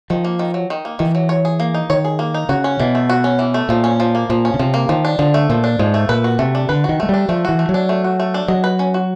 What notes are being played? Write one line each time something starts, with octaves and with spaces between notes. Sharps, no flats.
D#3 F3
A#3
D#3
F#3
D#3
A#3
D#3 E3
F#3
C#5
G#4
A#3
D#4
D#3 C#5
G#4
A#3
D#4
C#3 F#4
C#4
B2 E3
A3
F#4
C#4
E3
A3
A#2 F3
C#4
F3
A#3
A#2 F3
C#4
C#3
C3 F3
A#3
D#3 F3
D4
D3 F3
A3
A#2 F3
D4
G#2 F3
A3
A#2 B4
F#4
C3 A3
D4
D3 B4
D#3 F#4
G#3 A3
G3 D4
F3 A3
E3 F#4
A3
F#3
D4
A3
F#4
A3
D4
F#3 D#5
B4
C#4
F#4